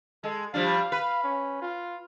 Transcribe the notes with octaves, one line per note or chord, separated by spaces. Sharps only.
G#3 A4
F3 G3 D4 F5
B4
C#4
F4